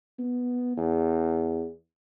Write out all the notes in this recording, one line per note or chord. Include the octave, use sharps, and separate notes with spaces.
B3
E2